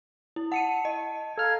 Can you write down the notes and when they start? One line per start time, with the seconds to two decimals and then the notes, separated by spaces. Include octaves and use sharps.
0.36 E4
0.52 F#5 A5 C#7 D#7
0.85 D#5
1.38 A4 F5 A#5 F6 G#6